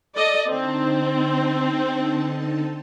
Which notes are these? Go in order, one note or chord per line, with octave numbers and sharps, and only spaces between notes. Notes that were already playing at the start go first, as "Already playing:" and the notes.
A4 D5 D#5
D3 C4 D#4 A5